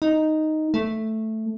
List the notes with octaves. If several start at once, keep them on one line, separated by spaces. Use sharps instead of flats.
D#4
A3